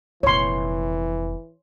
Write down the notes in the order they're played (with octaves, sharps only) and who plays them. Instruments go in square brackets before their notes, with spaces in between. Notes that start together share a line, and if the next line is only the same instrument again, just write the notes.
[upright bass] F1 A#2 [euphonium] E3 [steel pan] C#5 C6